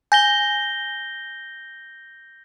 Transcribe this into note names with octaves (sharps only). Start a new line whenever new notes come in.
G#5 G6 A#6 G7